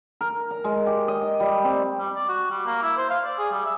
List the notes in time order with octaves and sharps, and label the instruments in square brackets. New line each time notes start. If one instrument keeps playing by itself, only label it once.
[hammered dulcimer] A#4
A#5
G#3
G4
D#5
G5
G3
C4
[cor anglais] G3
D5
F#4
G3
A#3
E4
C5
F5
D5
G#4
G3
E5